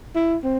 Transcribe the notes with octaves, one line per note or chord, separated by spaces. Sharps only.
E4
C4